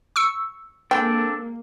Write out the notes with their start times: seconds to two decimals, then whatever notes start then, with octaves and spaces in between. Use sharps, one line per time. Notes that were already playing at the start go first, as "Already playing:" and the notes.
0.16 C#6 E6 C#7
0.91 G#3 A#3 C4 D4 A4 G5